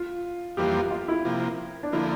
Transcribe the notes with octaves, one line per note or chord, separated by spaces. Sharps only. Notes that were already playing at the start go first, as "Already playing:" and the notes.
Already playing: F4
F2 E3 G3 A#3 F4 G4
F4
E4
C3 F3 A#3
D4
D3 F3 A#3 E4